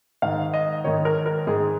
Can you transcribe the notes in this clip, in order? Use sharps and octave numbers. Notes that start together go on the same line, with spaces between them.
G#2 D#3 F5
D#5
G#2 D#3 C#5
A#4
A#4
G#2 D#3 G#4